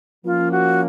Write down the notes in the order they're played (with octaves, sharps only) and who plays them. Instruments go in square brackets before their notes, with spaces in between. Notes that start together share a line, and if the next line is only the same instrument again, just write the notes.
[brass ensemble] F3 A#3 C#4 [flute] F4
[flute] F#4